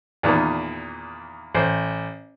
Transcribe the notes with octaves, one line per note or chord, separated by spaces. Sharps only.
E2 A#2 D#3
A1 C5